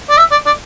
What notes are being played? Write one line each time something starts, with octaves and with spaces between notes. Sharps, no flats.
D5
E5
D5
D5